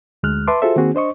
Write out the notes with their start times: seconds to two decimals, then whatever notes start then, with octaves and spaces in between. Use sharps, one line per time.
0.23 D2 G#3 F6 F#6
0.47 B4 E5 A5 C6 D6
0.62 F4 F#4 G#4 A4 C5 E5
0.76 D#3 A#3 C4 F#4 G#4
0.95 D4 C5 D#5 C#6